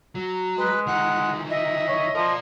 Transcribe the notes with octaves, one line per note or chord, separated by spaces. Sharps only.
F#3
G#3 B4
D#3 E3 F#5
D#5 E5
C#5
F3 A#4 D5